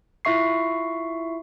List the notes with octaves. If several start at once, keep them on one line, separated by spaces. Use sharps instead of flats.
E4 F4 E5 C#6 C7